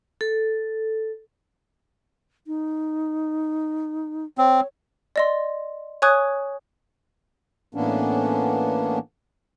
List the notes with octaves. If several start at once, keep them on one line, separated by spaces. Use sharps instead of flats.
A4
D#4
C4 C#5
D5 D#5 C6
C#5 G#5 C#6 D#6 F#6 G#6
A2 E3 A#3 B3 C#4 D4